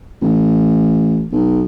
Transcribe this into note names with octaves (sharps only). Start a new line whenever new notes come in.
A1
B1